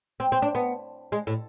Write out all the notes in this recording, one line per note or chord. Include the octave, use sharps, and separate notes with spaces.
C4
C4
D4
B3
G#3
A2